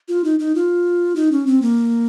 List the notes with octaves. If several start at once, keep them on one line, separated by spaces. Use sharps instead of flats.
F4
D#4
D#4
F4
D#4
C#4
C4
A#3